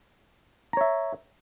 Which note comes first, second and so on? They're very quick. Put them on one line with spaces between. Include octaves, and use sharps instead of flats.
A#5 C#5 E5